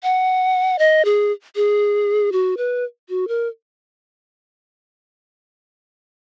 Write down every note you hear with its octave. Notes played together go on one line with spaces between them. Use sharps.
F#5
D#5
G#4
G#4
F#4
B4
F#4
A#4